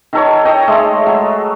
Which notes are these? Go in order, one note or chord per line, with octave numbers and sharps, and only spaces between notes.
D#3 A4 C#5
C#5 D#5 G5
G#3 A3 G#4
F#3